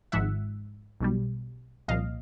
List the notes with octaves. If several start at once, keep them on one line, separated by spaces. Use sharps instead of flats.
G#1 G#2 F3 E5 F#5
B1 B2 G3
C2 A#2 F3 D#5 F5